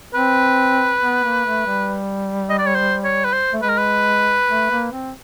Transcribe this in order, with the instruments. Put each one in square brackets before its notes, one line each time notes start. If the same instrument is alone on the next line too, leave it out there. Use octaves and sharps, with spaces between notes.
[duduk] C4 [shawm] B4
[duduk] B3
A#3
A3
G3
[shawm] D#5
D5
C#5
C5
C#5
B4
C5
[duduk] A3
[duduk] G#3 [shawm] B4
[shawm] A#4
B4
[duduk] A3
A#3
C4